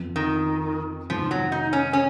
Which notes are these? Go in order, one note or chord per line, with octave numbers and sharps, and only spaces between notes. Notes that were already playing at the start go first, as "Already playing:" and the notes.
Already playing: F2 F3 B3
D#3
F1 F2 D#3 F3 G#3 B3
F#3
D#4
C#4
C#4